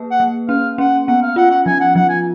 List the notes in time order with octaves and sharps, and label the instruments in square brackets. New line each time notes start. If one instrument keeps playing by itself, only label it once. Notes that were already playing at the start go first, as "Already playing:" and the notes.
Already playing: [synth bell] A#3 G#4 B4
[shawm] F#5
[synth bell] A#3
[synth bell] C#4 [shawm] F5
[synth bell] C#4 [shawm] F#5
[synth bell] B3 [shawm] F#5
[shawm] F5
[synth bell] F4 [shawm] F#5
[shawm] F#5
[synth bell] F3 [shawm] G#5
[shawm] F#5
[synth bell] F3 [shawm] F#5
[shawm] G#5